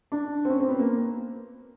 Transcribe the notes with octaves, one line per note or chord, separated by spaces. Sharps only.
D4
C4
C#4
C4
B3
A#3